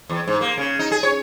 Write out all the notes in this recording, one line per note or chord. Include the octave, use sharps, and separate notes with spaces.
E2
G#2
A#3
C#3
D#4
G#4
C#5